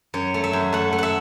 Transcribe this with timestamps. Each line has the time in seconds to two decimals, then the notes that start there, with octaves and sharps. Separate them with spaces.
0.14 F#2 C#5
0.34 A3
0.44 E5
0.53 F#2
0.73 A3 F#5
0.93 A3
0.98 E5 F#5